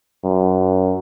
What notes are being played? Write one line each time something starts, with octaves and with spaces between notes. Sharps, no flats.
F#2